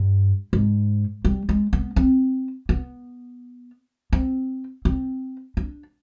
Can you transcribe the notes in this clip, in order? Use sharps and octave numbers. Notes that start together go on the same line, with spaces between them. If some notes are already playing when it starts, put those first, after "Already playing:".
Already playing: G2
G#2
G3
G#3
B3
C4
B3
C4
C4
D4